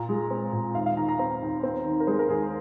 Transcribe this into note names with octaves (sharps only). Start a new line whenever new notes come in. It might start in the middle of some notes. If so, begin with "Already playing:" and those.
Already playing: A#2 A#5
G#3
C4
A#2
D#2 F5
F5
D#3 A#5
A#5
C4 A#5
D#2
C4
D#3
A#4
G#3 C5
A#4
D#2 G#4